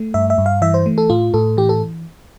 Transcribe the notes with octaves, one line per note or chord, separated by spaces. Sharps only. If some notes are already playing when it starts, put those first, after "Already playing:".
Already playing: A3
G2 E5
E5
G2
F5
E3 E5
C5
A3
A4
A2 F4
A2 A4
E3 G4
A4